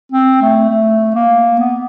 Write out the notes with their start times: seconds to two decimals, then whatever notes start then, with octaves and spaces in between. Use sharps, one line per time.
0.12 C4
0.41 A3
0.70 A3
1.15 A#3
1.59 B3